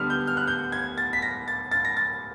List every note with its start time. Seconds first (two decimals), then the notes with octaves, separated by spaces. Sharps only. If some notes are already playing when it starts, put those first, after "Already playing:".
Already playing: D3 G3 B3 F6
0.10 G6
0.27 F6
0.37 F#6
0.47 G6
0.72 G#6
0.98 A6
1.13 B6
1.22 A#6
1.48 A6
1.71 A6
1.85 A#6
1.97 A6